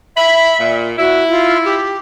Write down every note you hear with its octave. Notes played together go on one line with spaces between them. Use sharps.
E5 B5
A#2
E4 F#4
F4
G4